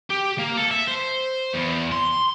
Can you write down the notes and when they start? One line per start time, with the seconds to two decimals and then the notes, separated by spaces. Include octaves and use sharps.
0.10 G4
0.38 A#3
0.57 A4
0.71 E5
0.88 C5
1.54 E2
1.92 C6